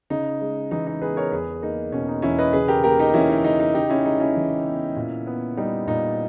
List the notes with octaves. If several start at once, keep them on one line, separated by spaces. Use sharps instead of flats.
C#3 D#4
G#3
E3 D#4
D#4
B3 G#4 B4
A#4 C#5
E2 G#4 B4
A#3 D#4
B2 C#4
D#4
E2 C#4 E4
B4 D#5
C#3 G#4 B4
G4 A#4
A#3 G4 A#4
D#4 G4
E3 C#4 E4
D#4
C#3 D#4
D#4
C#3 D#4 G4
C#4 E4
G#3 D#4
C#4 E4
E3
B3
A#2
B3
G3 D#4
A#2 D#4